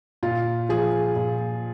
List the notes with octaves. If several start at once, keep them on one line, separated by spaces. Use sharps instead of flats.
A#2 F4
F3 G#4
A#2